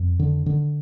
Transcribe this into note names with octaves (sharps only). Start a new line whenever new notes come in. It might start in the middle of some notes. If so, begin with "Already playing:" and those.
Already playing: F2
D3
D3